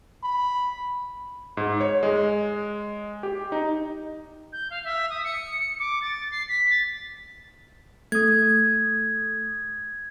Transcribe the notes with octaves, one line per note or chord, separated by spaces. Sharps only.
B5
G#2
C#5
G#3
G4
D#4
G6
F5
E5
D#6
C#7
D6
A6
C7
B6
A6
A3 D#6 G#6